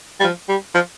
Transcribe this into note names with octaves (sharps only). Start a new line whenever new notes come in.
G3
F3
G3
F3